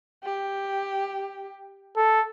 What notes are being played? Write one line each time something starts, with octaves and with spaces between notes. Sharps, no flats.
G4
A4